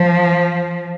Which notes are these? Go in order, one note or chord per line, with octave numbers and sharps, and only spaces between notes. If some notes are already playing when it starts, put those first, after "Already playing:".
Already playing: F3